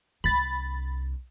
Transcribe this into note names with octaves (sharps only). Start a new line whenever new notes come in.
C2 D4 B5 A6